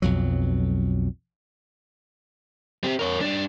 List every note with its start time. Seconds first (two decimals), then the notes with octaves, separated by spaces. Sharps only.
0.02 B1 F2 F#3
2.84 C4 G4
2.99 A#4 C#5
3.21 G2 D4